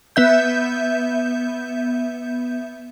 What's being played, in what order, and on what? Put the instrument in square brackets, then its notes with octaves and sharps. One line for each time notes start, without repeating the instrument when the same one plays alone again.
[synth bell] B3 E5 G6